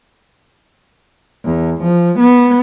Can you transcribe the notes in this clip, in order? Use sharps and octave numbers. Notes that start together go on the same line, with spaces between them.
E2
F3
B3